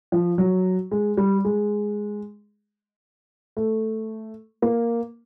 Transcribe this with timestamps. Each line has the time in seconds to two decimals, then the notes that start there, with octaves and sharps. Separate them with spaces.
0.12 F3
0.38 F#3
0.91 G#3
1.17 G3
1.45 G#3
3.57 A3
4.62 A#3